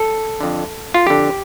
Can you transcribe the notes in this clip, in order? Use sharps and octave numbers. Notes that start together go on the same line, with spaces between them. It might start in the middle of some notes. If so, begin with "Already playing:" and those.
Already playing: A4
F2 D3
F4
F2 D3 G4